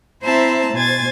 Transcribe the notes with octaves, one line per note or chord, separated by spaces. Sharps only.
C4 E4 C5 E5 A5 A#5
B2 C5 G#5 G#6 A6